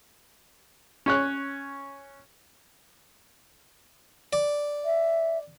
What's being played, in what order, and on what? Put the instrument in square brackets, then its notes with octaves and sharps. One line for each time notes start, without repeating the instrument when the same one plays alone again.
[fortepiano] C#4 C#5 F#6
[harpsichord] D5
[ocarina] E5